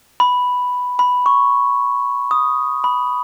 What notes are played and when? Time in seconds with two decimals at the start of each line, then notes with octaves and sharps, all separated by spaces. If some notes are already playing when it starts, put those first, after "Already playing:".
0.20 B5
0.99 B5
1.26 C#6
2.31 D#6
2.84 B5